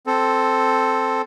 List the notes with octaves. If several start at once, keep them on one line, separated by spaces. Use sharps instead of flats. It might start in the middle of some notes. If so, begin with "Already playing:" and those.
C4 A4